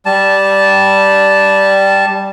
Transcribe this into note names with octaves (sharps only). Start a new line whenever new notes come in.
G3 A5